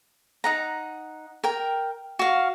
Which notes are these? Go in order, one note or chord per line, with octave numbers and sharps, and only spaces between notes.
D#4 F#5 A#5
A#4 G5
F#4 F5